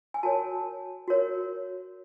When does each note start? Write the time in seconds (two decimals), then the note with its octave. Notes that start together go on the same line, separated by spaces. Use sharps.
0.14 G#5
0.23 F#4 A#4 C#5 A5
1.08 F#4 A#4 C#5